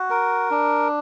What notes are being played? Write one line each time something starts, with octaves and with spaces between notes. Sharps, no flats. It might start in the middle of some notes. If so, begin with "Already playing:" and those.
Already playing: F#4
A#4
D4